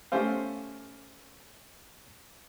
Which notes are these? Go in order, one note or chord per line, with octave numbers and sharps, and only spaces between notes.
A3 C#4 G4 C5 F5